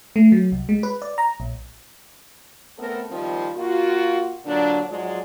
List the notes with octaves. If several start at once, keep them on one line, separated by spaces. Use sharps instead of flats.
A3
F#3
C2
G#3
B4
D5
A#5
A#1
A3 B3 C4 A4 A#4
D#3 F3 G3 C4
A#3 F4 F#4
A#2 D3 F#3 D4
G#2 F3 F#3 G#3 D5